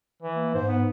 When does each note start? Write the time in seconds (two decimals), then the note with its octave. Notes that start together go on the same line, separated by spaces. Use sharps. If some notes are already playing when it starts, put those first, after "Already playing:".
0.22 E3
0.35 A#3
0.54 G#2 C5
0.68 B3